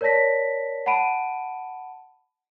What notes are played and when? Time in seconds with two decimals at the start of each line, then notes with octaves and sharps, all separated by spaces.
0.01 A#4 C#5 D5 A5 A#6 B6
0.86 F#5 A5 B5 D7 D#7